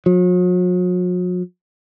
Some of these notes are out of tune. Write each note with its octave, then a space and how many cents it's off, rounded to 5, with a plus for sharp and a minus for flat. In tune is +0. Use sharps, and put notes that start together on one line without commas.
F#3 -45